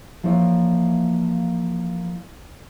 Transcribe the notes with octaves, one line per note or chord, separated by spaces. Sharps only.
E3 F3 A#3 E4 C#5